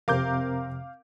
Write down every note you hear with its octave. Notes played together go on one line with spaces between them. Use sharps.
F2 C3 C4 A#4 F5 D6 G6